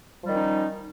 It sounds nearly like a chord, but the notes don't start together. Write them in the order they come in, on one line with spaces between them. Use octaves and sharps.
F3 G3 D#3 C#4 D#4